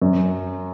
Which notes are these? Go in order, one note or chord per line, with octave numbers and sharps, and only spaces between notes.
F#2